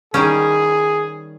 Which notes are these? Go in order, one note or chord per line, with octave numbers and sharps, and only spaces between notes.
D#3 G3 C#4 G#4